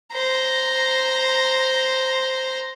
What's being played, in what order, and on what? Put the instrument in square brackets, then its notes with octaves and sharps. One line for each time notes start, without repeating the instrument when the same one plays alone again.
[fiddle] C5 A#5